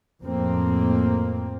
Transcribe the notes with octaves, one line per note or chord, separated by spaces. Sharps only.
F2 A2 A#3 C4